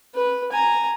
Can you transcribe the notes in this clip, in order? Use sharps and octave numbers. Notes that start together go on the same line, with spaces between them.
B4
G#5 A#5